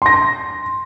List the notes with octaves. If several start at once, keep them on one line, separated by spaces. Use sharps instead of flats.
C6 A#6